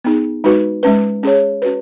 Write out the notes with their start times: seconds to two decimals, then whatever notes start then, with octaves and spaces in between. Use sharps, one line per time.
0.04 B3 D#4 G#4
0.44 G#3 D#4 F#4 B4
0.83 G#3 C#4 B4
1.23 C#4 G#4 C#5
1.62 C#4 F#4 B4